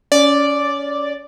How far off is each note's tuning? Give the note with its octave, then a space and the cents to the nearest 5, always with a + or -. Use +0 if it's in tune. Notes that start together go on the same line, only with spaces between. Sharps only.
C#4 +25 D5 +0